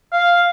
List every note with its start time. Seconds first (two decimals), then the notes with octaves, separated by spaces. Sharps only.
0.13 F5